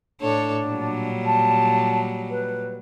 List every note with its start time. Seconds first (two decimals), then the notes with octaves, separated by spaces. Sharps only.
0.21 A2 D4 A4 C#5
0.65 A#2 F#3 G3
1.26 A5
2.31 B4